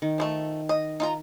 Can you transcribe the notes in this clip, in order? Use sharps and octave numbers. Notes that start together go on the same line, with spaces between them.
D#3
F3 G#3 A3
D#5
D#4 F4 A#5